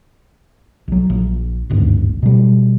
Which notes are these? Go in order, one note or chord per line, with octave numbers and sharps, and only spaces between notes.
B1 F#3
A#1 A#2
D#1 G#1 D2 G2
B2 G3